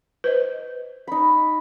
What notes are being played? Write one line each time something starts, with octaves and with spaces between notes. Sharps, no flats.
B4 C5 D#5
D#4 B5